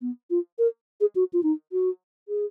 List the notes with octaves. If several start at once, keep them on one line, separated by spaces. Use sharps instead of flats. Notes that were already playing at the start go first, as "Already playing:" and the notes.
B3
F4
A#4
G#4
F#4
F4
D#4
F#4
G#4